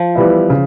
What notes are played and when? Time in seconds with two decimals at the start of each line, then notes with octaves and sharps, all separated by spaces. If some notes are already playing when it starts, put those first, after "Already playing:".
Already playing: F3
0.15 E3 G3 B3 E4
0.50 C#3